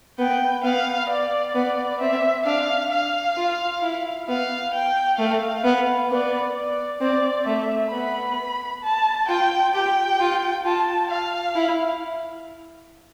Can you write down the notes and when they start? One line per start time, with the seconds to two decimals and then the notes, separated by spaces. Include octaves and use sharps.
0.18 B3 G5
0.64 B3 F5
1.09 D5
1.55 B3 D5
2.01 C4 E5
2.46 D4 F5
2.91 F5
3.37 F4
3.82 E4
4.28 B3 F5
4.74 G5
5.19 A3 F5
5.64 B3
6.10 B3 D5
6.56 D5
7.01 C4 D5
7.46 A3 E5
7.92 B3 B5
8.83 A5
9.28 F4 G5
9.74 G4 G5
10.20 F4
10.65 F4 A5
11.11 F5
11.56 E4